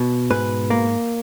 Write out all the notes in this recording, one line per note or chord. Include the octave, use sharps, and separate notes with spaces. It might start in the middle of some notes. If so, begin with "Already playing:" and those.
Already playing: B2
G#2 B4
A#3